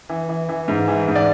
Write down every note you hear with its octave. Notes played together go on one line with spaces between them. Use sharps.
E3
E3
E3
G#2
E3
G#2
D5